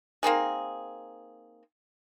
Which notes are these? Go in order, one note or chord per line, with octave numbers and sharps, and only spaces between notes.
A#3 C4 D#4 G#4